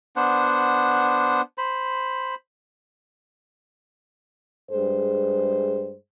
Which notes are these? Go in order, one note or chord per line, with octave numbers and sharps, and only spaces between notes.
B3 D4 C5 F#5
C5 B5
G2 G#3 G#4 C5